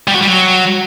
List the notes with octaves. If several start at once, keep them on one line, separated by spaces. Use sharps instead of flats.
G3
F#4
G3
F#3